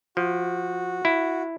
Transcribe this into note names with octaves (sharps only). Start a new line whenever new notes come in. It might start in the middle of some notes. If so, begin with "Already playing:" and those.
F3 F#4
E4